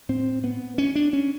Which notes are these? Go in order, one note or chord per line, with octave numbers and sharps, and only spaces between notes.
A2 C4
B3
C#4
D4
C#4